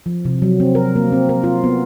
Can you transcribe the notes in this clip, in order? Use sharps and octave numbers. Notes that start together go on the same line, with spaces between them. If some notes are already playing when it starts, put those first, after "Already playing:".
F3
C3
F#3
C4
A#4
A#3
C4
A#4
F4
B3